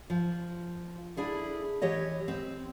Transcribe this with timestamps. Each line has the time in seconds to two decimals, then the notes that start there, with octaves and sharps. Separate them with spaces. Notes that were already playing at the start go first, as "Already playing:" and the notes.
0.10 F3
1.17 D4 E4 G#4 A4
1.82 E3 G4 C#5 D#5
2.28 C4